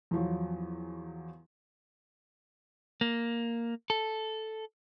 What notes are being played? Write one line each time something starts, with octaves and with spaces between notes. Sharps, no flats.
E2 F3 F#3
A#3
A4